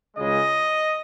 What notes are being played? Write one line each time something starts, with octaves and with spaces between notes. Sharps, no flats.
C#2 C#3 G#3 D#5